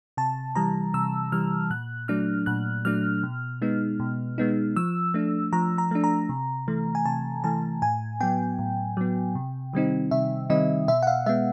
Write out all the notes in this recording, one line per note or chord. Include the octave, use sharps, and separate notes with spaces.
C3 A5
E3 G3 A#5
C3 E6
E3 G3 F6
A#2 F#6
F#3 A3 D4 F6
A#2 F#6
F#3 A3 D4 F6
B2
G#3 B3 D#4
B2
G#3 B3 D#4
F3 E6
A3 D4
F3 A#5
A#5
A3 D4
A#5
C3
E3 A3
G#5
C3 A5
E3 A3 A5
A2 G#5
F#3 B3 G5
A2
F#3 B3
C3
D#3 G3 C4 D#4
C3 E5
D#3 G3 C4 D#4 D#5
B2 E5
F#5
F5
G#3 B3 E5